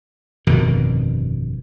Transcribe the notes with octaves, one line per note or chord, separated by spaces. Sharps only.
G1 F2 B2 D#3